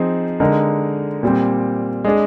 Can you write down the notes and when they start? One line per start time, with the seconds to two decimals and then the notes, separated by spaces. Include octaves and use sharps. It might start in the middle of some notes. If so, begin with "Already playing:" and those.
Already playing: F3 C4 D#4 G#4
0.40 D3 G#3 D#4 A#4
1.23 A#2 G3 C4
2.05 G#3 D4 G#4